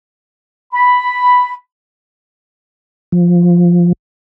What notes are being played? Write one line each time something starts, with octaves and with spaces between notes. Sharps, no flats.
B5
F3